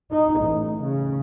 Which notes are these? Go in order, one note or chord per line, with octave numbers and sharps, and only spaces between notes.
D#4
A1
C#3